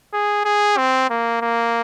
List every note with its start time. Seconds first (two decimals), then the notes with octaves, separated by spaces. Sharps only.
0.13 G#4
0.45 G#4
0.77 C4
1.10 A#3
1.42 A#3